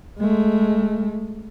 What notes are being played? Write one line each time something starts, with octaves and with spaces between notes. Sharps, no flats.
G#3 A3